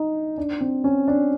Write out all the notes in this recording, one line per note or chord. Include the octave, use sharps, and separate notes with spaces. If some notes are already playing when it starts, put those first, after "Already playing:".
Already playing: D#4
D4
C4
C#4
D4